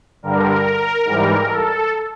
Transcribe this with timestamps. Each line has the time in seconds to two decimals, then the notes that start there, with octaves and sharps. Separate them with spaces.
0.23 G2 D3 G3 A#4
1.05 G#2 E3 G3
1.47 A4